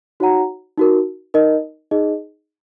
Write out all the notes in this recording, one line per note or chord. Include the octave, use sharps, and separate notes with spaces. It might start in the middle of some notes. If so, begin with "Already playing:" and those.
D#4 F#4 C#5 F#5 A#5
D#4 F#4 A#4
D#4 A#4 D#5
D#4 G#4 D#5